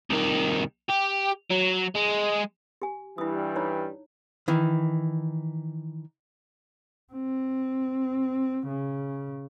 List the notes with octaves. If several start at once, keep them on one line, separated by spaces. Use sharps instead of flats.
C2 D#3
G4
F#3
G#3
G4 G#5
G2 E3 G3 E4 D#6
D#4 C#5 A#5
D#3 E3
C4
C#3